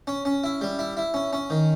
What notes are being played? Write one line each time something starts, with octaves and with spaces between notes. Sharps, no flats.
C#4
C#4
E4
G3
E4
E4
C#4
C#4
D#3